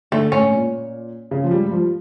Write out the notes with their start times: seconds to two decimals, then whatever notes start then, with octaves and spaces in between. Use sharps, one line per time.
0.12 D3 A3
0.32 A2 C#4
0.52 A#2
1.31 C#3
1.44 F3
1.51 G3
1.66 G3
1.71 F3